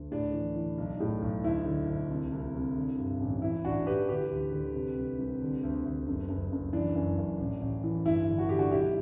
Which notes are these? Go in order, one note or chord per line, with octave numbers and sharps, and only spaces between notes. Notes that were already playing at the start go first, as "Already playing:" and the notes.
Already playing: D2
A2 D4
E3
E3
B1
A2
B1
D2 E4
D3
D2
C2
C2
C2
D3
G2
A1
E3 E4
A1 D4 F#4
E3 G4 B4
D3 G4 B4
D2
D3
C3
C2
C2
D3
D2
D2
F#1
F#1
F#1
E3 D4
F#2
F#2
A1
A1
E3
G1 E4
D3
F#4
D3 G4
D4 F#4
B1 E4 G4